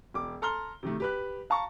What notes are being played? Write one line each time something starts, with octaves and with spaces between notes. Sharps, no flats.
E1 D6
A4 A#5 C6 F6 G7
C3 D#3 A3
G4 B4 F#6
F5 A5 A#5 C#6